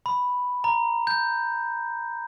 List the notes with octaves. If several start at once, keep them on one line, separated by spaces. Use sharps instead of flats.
B5
A#5
G6